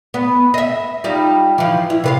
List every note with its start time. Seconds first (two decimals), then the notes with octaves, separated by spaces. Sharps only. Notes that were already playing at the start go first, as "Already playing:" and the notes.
0.14 B3
0.54 D#5 E5
1.04 G3 D#4 F4
1.58 E3 F3
1.90 E4
2.04 C3 B4 F5